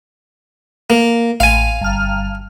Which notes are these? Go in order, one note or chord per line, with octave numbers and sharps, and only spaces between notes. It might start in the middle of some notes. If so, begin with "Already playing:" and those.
A#3
A1 F5 G#5
G1 F6